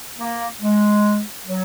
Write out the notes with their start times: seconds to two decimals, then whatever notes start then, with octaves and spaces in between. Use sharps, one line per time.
0.18 A#3
0.61 G#3
1.46 F#3